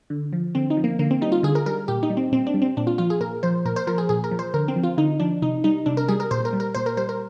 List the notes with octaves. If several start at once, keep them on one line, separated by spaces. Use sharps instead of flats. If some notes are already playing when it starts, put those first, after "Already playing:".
D3
F3
D3 C4
D#4
F3
A#3
D3 A#3
C4
G3 D#4
F4
D3 G#4
A#4
G3 A#4
A#2 G4
D#4
G3
C4
A#2 C4
D4
G3
C4
A#2 D4
F4
F3 F4
G#4
A#2 A#4
F3 C5
A#2 A#4
C5
F3 A#4
G#4
A#2 G#4
A#4
F3
C5
D3 A#4
C4
F3
F4
D3 D#4
F3 D4
C3 D#4
G3 D#4
C3 D4
A#4
G3 G#4
A#4
A#2 C5
A#4
G3
A#4
A#2 C5
A#4
G3 C5
A#4